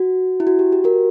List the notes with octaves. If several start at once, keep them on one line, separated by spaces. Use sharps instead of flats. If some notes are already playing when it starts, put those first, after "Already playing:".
Already playing: F#4
E4
F#4
G4
G4
F#4 A#4